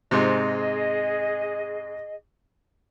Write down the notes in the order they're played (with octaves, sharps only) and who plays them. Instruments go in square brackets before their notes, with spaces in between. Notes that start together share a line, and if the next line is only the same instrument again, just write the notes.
[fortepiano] G#2 C3 [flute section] G#4 D#5